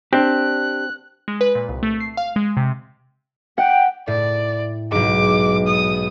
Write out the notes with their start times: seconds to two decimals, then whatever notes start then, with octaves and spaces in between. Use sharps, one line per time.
0.13 C4 D4 G4 F#6
1.28 G#3
1.41 B4
1.55 A#2
1.69 C2
1.83 A3
2.00 C7
2.17 F5
2.36 G#3
2.57 C3
3.58 F#5 G5
4.08 A2 D5
4.92 B1 G#2 D6
5.67 D#6